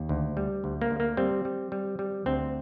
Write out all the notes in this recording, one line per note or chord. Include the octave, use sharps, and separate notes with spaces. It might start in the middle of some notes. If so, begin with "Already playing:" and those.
Already playing: D#2
D2
G3
D2
A#3
D2
A#3
G3 C4
G3
G3
G3
D2 C4